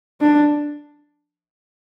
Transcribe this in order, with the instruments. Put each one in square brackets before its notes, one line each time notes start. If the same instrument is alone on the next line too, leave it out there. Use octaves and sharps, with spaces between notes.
[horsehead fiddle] D4